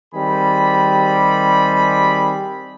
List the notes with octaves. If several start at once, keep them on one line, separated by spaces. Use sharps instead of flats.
D#3 G3 C4 G#4 B5